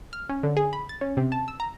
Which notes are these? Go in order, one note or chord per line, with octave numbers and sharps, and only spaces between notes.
F6
C#4
D3
G#4
B5
A6
C#4
C3
A5
E6
A#5